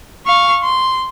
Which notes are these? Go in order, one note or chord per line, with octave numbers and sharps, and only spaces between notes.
F5 C#6
C6